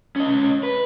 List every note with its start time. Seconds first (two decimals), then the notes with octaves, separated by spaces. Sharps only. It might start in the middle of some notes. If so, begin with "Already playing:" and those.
0.16 C#4 D#5
0.63 B4